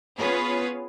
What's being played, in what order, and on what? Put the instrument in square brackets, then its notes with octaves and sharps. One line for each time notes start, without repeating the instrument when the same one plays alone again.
[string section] B3 C#4 F4 G#4 B4 C#5